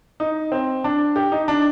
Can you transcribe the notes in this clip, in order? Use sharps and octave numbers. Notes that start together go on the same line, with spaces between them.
D#4
C4
D4
G4
D#4
D4